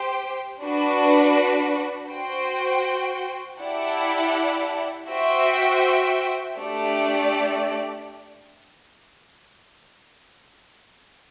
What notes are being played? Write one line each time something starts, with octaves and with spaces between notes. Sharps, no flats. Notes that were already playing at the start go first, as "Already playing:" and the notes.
Already playing: G4 C5 G5
D4 F#4 B4
F#4 C5 G5
E4 G4 D5 F#5 A5
F#4 C5 E5 G5
A3 D4 G4 D5